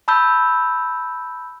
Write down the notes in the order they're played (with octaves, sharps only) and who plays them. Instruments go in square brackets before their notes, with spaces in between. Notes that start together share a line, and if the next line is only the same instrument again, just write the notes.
[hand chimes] A5 B5 E6 G6